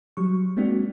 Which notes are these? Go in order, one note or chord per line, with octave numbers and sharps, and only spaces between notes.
F#3 G3 C#6
G#3 A#3 C4 D4 F#4